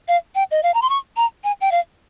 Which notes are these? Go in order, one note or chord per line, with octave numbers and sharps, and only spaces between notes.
F5
G5
D#5
F5
A#5
C6
C#6
A#5
G#5
G5
F5